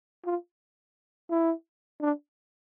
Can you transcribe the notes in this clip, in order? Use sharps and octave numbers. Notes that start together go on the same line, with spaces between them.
F4
E4
D4